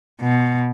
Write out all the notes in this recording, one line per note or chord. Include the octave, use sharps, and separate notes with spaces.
B2